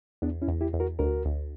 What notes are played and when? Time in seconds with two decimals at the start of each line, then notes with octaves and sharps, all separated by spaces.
0.22 E2 B3 D4
0.42 C#4 E4
0.48 E2
0.61 E4 G4
0.73 E2
0.80 F#4 A#4
0.99 D2 F#4 A#4
1.25 D2